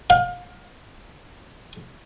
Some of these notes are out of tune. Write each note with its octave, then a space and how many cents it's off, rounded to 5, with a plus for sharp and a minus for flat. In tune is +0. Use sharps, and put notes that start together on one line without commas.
F5 +30